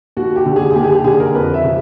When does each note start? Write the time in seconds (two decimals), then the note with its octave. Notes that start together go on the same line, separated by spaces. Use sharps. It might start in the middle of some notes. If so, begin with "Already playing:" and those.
0.17 D#2 F#4
0.36 G4
0.46 D3
0.56 G#4
0.70 G#4
0.75 D#2 G4
0.84 G#4
0.90 G4
1.04 D3 G#4
1.20 A#4
1.35 F2 B4
1.54 E5
1.64 C#3